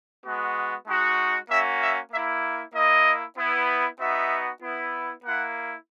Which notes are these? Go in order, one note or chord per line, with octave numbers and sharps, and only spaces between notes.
G#3 B3 F#4
G#3 D#4 F#4
A#3 C#4 F#4 E5
E5
A#3 E5
E4
A#3 E4 D#5
B3 E4
B3 D#4 F#4 E5
B3 E4
A#3 E4 F#5